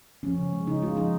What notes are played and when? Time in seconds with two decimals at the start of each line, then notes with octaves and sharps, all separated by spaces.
0.23 F3 C#4
0.38 C#3
0.52 G#3
0.67 C#3 D#4
0.82 G#3 F4
0.97 F3 D#4